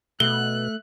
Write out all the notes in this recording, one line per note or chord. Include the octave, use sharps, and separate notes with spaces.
B2 A3 F#6 G7